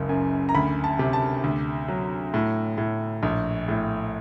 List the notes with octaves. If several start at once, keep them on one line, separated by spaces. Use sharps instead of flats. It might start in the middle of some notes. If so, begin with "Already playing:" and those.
Already playing: F#1 C#2
F#2
A#5
D2 B5
A5
C3
A5
D2
F#3
A2
A2
A#1
A2